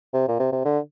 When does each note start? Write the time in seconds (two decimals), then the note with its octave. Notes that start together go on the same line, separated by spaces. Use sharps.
0.13 C3
0.28 A#2
0.39 C3
0.52 C3
0.65 D3